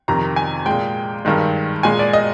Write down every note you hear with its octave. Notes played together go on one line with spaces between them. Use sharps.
F2 C3 D#3 A#5
G#5
A#2 G#3 G5
G2 D#3 G#3
A#2 G#3 G#5
D5
D#5